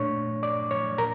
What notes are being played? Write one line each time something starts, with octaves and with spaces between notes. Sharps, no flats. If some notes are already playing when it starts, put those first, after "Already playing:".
Already playing: A#2 A3 D4 C#5 C#6
D5 D6
C#5 C#6
A#2 A#4 A#5